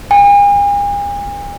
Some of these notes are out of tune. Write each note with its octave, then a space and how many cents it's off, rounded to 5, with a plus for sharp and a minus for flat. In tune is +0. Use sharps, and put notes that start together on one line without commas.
G#5 -40